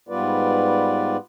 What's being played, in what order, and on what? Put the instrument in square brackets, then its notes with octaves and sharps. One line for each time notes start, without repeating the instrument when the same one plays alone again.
[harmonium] G#2 G3 B3 F4 B4 D5